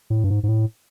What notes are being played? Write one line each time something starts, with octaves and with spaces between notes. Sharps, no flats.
A2
G2
G#2
G#2
A2